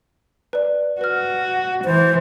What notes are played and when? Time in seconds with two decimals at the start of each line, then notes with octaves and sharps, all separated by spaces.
0.53 B4 D5
1.01 F#4 B4 F6
1.85 E3 C5